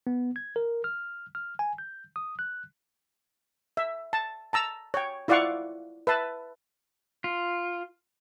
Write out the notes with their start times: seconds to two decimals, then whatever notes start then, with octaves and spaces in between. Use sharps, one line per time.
0.07 B3
0.36 G#6
0.56 A#4
0.84 F6
1.35 F6
1.59 G#5
1.78 G6
2.16 D#6
2.39 F#6
3.77 E5
4.13 A5
4.53 A5 A#5 E6
4.94 C#5 G5
5.28 E4 F4 D5 F5 F#5 C#6
6.07 B4 E5 A5
7.24 F4